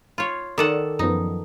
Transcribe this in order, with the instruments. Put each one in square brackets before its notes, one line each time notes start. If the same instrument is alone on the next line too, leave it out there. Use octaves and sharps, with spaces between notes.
[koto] F4 C#5
[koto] D#3 A4 F#5 [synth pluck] D5
[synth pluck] F#2 F3 B3 [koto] D#4